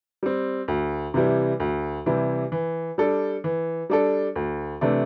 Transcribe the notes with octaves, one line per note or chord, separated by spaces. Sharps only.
G3 C4
D2
C3 E3 G3 E4
D2
C3 E3 G3 E4
E3
G3 D4 A4
E3
G3 D4 A4
D2
C3 E3 A3 D4